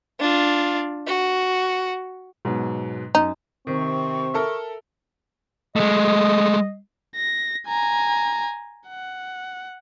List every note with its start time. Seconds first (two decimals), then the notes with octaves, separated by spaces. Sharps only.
0.20 D4 F4
1.07 F#4
2.45 G#2 B2 F#3
3.15 F#2 D#4
3.67 C3 D#3 C4 C#6
4.34 A4 A#4 E5
5.76 G#3 A3 D#5
7.16 A#6
7.68 G#5 A#5
8.88 F#5